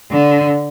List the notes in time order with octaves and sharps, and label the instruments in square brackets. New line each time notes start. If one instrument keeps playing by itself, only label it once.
[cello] D3